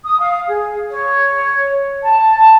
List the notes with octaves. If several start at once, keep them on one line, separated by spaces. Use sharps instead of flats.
D#6
F5
G#4
C#5
A5